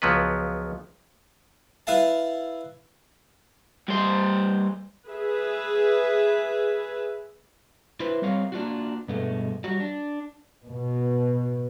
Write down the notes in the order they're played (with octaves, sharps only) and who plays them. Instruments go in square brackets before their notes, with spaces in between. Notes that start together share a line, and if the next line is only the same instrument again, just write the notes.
[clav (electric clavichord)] C#2 F3 F#3 B3 B4
[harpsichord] E4 B4 E5 F5 A5
[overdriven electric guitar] G2 C5
[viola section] G#4 B4 E5
[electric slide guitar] E4 B4 C5
G3 C4 A#4 C#5 F5
A#3 D4 F4 F#4
G2 B2 G#3 A3
F#3 G3 F#4
D4
[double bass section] B2